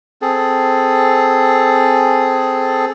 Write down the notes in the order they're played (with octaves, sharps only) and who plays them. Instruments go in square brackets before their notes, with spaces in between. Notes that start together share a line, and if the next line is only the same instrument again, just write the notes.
[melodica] C4 G#4 A4